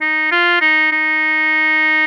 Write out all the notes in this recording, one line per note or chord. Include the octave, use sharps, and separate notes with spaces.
D#4
F4
D#4
D#4